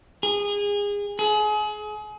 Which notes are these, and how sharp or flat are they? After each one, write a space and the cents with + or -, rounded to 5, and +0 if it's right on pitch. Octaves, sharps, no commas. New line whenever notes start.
G#4 -25
G#4 +30